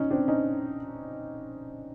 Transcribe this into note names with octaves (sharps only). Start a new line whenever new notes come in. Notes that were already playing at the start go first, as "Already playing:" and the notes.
Already playing: C#4 D#4
C4 D4
C#4 D#4